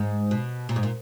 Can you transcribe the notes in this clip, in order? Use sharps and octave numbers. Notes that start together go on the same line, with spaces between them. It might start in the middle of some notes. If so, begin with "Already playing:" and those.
Already playing: G#2
B2
A#2
G#2
A#2